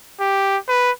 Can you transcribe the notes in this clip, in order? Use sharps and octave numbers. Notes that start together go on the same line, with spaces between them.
G4
B4